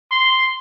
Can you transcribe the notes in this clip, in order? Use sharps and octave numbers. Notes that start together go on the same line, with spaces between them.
C6